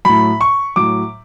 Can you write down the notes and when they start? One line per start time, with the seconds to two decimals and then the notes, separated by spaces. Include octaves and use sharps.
0.05 A2 F#3 B5
0.41 C#6
0.76 A2 F#3 D6